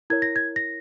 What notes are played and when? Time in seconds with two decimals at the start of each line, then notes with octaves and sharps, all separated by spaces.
0.10 E4 A#4 C#5 G#6
0.22 A#6
0.36 G#6
0.56 A#6